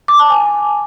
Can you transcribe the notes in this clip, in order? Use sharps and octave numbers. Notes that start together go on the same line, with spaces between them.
D6
A5
G#5